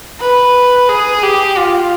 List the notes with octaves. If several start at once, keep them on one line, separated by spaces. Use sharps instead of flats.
B4
G#4
G4
F4